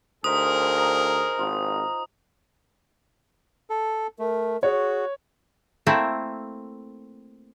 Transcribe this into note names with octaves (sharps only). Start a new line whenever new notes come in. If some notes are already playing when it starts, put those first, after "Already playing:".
D2 D#4 G#4 A#4 C5 D#6
A#5
G#1 F4
A4
A3 A#4
F#4 G#4 C#5
A3 A#3 C4 E4